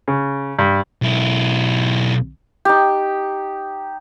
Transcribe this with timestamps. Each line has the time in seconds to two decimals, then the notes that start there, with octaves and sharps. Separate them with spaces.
0.08 C#3
0.59 G2
1.02 B1 E4
2.65 D#4 G4